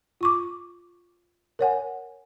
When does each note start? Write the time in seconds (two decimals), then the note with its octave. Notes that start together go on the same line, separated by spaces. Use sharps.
0.21 F4 C#6 D6
1.59 A#4 C#5 F#5 G#5